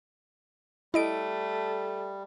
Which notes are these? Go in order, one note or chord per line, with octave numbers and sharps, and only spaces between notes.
G3 A3 E4 D#5 D7